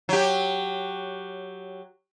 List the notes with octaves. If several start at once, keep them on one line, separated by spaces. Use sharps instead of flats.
F#3 G4